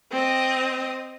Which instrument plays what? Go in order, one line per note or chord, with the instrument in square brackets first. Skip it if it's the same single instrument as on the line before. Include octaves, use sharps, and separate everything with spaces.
[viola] C4 D#5